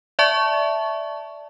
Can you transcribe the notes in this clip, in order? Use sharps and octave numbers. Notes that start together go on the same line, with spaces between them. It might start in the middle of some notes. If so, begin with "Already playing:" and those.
D5 E5 A5 C#6